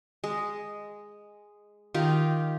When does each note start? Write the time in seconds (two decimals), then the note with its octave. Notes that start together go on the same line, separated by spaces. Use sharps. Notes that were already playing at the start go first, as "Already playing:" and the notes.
0.24 G#3
1.94 D#3 F4 G4